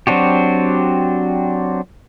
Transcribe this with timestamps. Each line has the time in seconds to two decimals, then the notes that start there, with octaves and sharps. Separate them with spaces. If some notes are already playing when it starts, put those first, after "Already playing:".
0.07 F#3 C4 D4 F#4 G4